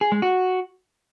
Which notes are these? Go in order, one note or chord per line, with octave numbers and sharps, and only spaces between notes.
G#4
G#3
F#4